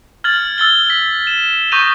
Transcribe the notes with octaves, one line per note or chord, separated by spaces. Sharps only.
F6 G#6 A6 F#7
E6 A6 G7
B6
E7
C#6 D#6 G6 A#6 D#7 F7